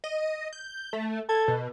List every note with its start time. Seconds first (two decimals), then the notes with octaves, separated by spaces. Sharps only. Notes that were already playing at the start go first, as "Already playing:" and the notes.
0.04 D#5
0.53 G6
0.93 A3
1.29 A4 G#6
1.48 B2